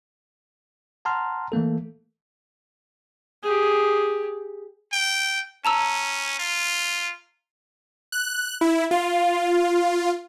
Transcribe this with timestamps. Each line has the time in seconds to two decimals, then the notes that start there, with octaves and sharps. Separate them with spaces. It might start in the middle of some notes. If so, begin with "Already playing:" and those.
1.05 F#5 A5 A#5 C6 F6
1.52 E3 A3 A#3 A4
3.43 G4 G#4
4.93 G5
5.65 C#4 A5 A#5 E6
6.39 F4
8.12 F#6
8.61 E4
8.91 F4